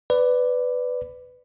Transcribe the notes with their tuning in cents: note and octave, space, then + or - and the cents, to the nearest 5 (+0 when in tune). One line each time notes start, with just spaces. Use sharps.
B4 +15 D5 +0